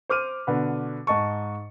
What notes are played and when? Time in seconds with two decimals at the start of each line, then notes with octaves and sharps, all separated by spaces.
0.09 C5 D6 F6 D#7
0.47 B2 D3 B4
1.07 G#2 D#5 A5 C#6